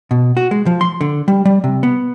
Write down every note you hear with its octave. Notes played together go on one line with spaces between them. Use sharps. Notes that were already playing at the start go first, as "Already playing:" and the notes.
B2
F#4
G#3
F3
C6
D3
G3
G3
C3
B3